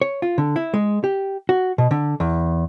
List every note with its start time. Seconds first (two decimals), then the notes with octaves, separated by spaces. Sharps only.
0.02 C#5
0.22 F4
0.38 D3
0.56 E4
0.74 G#3
1.04 G4
1.49 F#4
1.78 B2
1.91 D3
2.20 E2